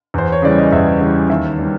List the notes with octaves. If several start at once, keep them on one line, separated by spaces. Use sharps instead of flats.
E2 C5
C#5
C#3 E3 G3 D5
D#5
E2 E5
C#3 E3 G3
D#2 E5
D#3 G3